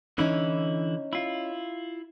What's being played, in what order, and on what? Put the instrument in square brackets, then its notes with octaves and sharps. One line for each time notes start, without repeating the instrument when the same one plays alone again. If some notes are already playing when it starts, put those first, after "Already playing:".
[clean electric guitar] D3 E3 E4 [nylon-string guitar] C#4 D#4
[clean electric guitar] E4 F4